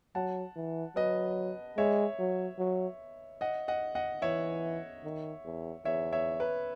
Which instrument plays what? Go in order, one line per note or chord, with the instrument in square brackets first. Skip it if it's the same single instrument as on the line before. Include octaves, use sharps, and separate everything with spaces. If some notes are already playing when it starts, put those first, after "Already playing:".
[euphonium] F#3 [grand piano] F#5 A5
[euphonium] E3
[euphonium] F#3 [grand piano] B4 D#5
[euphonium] G#3 [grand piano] C#5 E5
[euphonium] F#3
F#3
[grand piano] D#5 F#5
D#5 F#5
D#5 F#5
[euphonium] E3 [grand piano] C#5 E5
[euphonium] D#3
E2
[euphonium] E2 [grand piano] C#5 E5
[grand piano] C#5 E5
B4